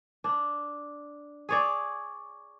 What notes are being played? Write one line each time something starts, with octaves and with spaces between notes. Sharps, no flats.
D4
G#4 C#5 D5